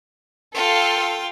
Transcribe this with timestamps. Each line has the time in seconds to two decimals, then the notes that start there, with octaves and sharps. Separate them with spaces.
0.55 F4 A4 F5 G5